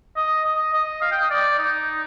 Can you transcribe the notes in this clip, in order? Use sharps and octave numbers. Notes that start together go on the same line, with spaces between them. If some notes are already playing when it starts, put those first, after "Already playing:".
D#5
D#5
D#5
F5
G5
D#5
D5
D#4